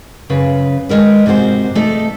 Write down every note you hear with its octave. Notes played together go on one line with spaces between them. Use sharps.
F#2 C#3 B4
D#3 G#3 A#4 B4
G#2 C3 F#4 A#4 C5
A3 D#4 A4